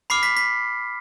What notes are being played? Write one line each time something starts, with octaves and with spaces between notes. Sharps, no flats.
B5 D6 F6 C7
B6
B6